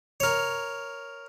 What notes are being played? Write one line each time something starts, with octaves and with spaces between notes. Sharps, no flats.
A#4 C#5